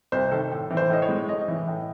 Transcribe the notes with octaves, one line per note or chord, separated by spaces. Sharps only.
C2 C5
D#3 A4
A2
E3
C5
A2 D#5
C#5
G#3
A2 D#5
E3
A2